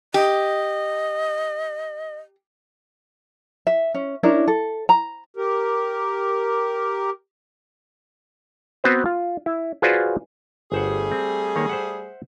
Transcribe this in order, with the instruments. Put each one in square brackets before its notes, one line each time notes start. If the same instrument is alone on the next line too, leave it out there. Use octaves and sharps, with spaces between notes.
[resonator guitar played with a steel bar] G4 [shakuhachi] D#5
[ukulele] E5
C#4
C#4 D4 E4 A#4
A4
A#5
[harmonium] G4 A#4
[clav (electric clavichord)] B3 C4 F#4 B4 C5
F4
E4
F4 F#4 G#4 B4 C5 D5
[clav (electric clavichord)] G1 C5 F#5 [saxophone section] G3 A3 G#4
[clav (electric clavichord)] C4
D#3 A#3 C#5
C5 E5 F#5